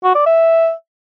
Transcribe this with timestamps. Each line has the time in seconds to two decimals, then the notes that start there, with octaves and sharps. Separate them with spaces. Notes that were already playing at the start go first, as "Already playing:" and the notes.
0.04 F#4
0.15 D5
0.26 E5